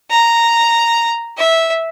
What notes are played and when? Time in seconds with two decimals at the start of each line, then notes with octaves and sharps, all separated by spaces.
0.10 A#5
1.38 E5